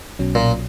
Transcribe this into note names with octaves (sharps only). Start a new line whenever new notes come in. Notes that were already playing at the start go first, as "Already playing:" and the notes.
B1 B2 F#3 C#4
A#2